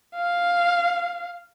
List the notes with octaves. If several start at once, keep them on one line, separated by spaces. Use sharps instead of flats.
F5